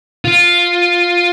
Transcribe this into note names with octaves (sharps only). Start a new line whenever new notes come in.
F4